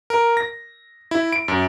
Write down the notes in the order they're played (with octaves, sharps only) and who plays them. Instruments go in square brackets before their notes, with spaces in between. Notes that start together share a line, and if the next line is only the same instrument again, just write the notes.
[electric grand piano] A#4
A#6
E4
D7
F#2